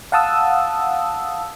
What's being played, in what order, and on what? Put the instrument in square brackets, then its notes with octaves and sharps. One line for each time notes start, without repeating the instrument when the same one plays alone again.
[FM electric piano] F5 F#5 A5 D#6 E6